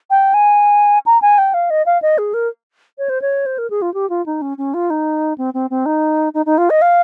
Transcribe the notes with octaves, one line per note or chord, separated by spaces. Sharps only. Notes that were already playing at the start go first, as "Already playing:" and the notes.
G5
G#5
A#5
G#5
G5
F5
D#5
F5
D#5
G#4
A#4
C#5
C5
C#5
C5
A#4
G#4
F4
G4
F4
D#4
C#4
C#4
F4
D#4
C4
C4
C4
D#4
D#4
D#4
F4
D#5
F5